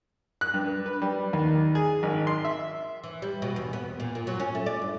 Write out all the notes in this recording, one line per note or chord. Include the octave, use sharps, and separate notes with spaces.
F#6
G2
B4
G3
D#2
G#4
G#1
C6
E5
E3
G3
B2
E2
B3
A#2
A#2
F#3
C#4
A3
D5
G2